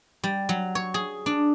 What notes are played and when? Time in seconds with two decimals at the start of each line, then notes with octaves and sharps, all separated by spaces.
0.24 G3
0.49 F#3
0.75 C#5
0.94 G#4
1.26 D4